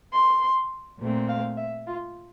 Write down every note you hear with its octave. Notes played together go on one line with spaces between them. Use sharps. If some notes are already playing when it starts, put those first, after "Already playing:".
C6
A#2 A3 C4
F5
E5
F4